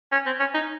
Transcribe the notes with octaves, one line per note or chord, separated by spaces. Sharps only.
C#4
C4
C#4
D#4